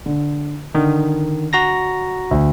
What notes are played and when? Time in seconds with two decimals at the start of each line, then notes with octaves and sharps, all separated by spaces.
0.06 D3
0.75 D3 D#3
1.53 F#4 A#5 A#6
2.31 D2